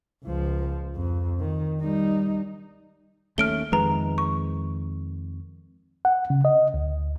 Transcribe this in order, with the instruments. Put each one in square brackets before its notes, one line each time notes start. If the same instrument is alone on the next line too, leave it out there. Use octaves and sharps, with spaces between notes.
[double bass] C#2 F3
F2
D#3
G3 D#4
[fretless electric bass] D#2 A3 C#4 [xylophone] F6 D7 G7
[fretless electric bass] F2 D#3 G#3 [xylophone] B4 A#5
[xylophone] C#6
[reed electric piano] F#5
C#3
D#5
D2